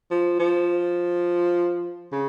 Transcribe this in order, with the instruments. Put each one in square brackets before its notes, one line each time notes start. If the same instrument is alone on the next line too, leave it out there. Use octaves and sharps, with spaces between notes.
[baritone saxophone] F3
F3
C#3